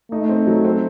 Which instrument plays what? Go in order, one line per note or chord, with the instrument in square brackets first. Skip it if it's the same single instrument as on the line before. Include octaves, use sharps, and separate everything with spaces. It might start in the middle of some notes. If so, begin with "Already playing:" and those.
[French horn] A3 [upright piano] D#4
[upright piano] C4
F#3
C4